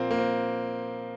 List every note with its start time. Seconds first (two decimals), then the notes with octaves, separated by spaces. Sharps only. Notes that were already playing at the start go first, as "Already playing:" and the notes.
Already playing: A#2 F3 A#3 C4
0.11 A#3
0.18 C4